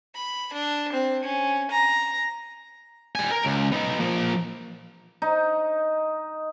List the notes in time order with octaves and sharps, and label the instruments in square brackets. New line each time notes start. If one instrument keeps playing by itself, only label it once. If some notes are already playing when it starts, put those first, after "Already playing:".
[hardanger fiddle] B5
D4
C4
C#4
A#5
[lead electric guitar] G3 G#5
A#4
C#2
B3 D#4
F3 A#3
[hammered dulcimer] D#4